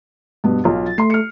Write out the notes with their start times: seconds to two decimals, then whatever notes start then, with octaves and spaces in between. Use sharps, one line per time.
0.44 G2 B2 B3
0.64 B1 F4
0.85 A6
0.98 A3 C6 C7
1.10 F6 C#7